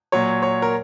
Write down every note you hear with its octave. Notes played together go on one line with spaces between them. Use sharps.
A#2 F#3 C#5
C#5
A#4